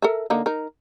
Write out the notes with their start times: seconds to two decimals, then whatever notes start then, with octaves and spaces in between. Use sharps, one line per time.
0.02 A4 A#4 E5
0.30 D3 A#3 D#4
0.46 D#4 A#4